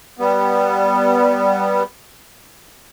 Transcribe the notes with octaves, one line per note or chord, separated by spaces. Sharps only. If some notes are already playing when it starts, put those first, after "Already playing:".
G3 B3